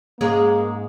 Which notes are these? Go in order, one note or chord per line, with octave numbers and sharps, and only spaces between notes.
G#2 G#3 A#3 C#4